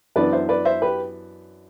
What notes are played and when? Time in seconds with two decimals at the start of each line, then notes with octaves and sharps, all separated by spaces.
0.16 F#2 E3 B3 D4 B4 D5
0.33 C5 E5
0.49 B4 D5
0.65 C5 E5
0.82 G4 B4